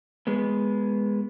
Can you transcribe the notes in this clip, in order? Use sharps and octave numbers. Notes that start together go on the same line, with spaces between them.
G#3 B3